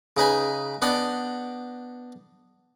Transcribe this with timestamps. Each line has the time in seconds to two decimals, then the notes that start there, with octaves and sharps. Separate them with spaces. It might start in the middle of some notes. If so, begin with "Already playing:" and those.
0.17 C#3 D#4 B4 G#5
0.82 B3 D4 D#5 F#5 G5